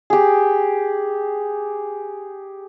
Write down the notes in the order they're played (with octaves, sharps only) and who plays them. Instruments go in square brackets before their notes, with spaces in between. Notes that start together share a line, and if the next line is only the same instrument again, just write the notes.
[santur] G4 G#4